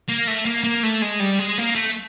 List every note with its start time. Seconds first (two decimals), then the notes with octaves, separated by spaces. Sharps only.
0.08 A#3
0.27 A3
0.45 A#3
0.64 A#3
0.83 A3
1.02 G#3
1.20 G3
1.39 G#3
1.58 A#3
1.75 A3